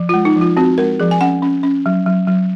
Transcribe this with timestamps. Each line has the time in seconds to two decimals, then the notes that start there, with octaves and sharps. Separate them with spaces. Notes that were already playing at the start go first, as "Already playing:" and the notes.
Already playing: F3
0.09 G#3 F4
0.25 D#4
0.36 F3 F4
0.57 C4 F#4
0.78 G#3 A#4
1.00 F3 G#4
1.11 G#5
1.21 C#4 F#5
1.42 C#4
1.63 C#4
1.86 F#3
2.06 F#3
2.27 F#3